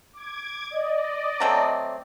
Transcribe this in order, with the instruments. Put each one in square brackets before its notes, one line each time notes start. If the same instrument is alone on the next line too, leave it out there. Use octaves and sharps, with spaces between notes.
[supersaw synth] D6 G#6
D5 D#5
[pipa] F#3 A3 C4